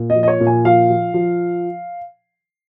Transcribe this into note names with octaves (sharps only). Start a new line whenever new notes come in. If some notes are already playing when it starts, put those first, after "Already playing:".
Already playing: A#2
D#5
F3
D#5
C#5
A#2
G#5
F3 F5
F3
F3